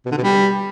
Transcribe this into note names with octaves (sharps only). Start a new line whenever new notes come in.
B2
D3
B2
G3